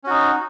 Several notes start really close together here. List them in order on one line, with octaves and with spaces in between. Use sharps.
C#4 F#4 D#4